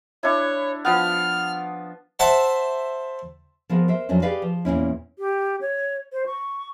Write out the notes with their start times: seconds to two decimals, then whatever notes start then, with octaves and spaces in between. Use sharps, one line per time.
0.23 D4 E4 C#5
0.85 F3 B3 F6
2.20 C5 E5 F#5 A5
3.69 F3 B3 G#4 A#4
3.88 A#4 C5 E5
4.09 F2 F#3 C#4 D4
4.22 G4 G#4 B4 D5 F5
4.42 F3
4.65 E2 A#2 C#4 E4
5.19 G4
5.61 C#5
6.12 C5
6.26 C#6